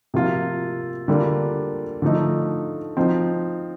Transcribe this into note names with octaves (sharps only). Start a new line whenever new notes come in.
C3 F3 A#3 F4
D3 G3 A#3 F4
D3 F3 A3 D#4
F3 C4 D#4